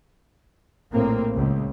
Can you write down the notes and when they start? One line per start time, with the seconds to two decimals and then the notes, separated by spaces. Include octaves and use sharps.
0.92 A#1 A2 A#3 C4
1.34 C#2